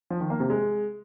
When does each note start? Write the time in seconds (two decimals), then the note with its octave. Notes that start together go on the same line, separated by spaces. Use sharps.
0.10 F3
0.20 D#3
0.30 A#3
0.40 C3
0.50 G#3